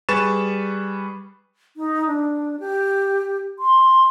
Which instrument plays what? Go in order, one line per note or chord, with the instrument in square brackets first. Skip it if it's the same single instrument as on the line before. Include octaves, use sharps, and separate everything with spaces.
[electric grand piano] G3 G#4 B4 C#6 A6 E7
[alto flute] D#4
D4
G4
C6